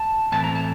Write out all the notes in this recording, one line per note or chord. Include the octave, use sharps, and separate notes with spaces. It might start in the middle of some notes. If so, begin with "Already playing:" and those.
Already playing: A5
A2 E3 A3 C4 E4 A5
A#5
A5